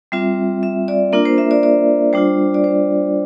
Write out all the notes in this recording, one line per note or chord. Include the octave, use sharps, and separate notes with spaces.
G3 C4 F4 E5
E5
D5
A#3 D4 F4 A#4
C5
E5
D5
D5
G3 D4 F4 C5
D5
C5